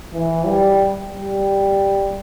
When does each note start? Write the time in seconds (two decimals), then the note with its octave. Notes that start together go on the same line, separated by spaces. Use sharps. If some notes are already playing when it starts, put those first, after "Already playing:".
0.13 E3
0.46 G3
1.12 G3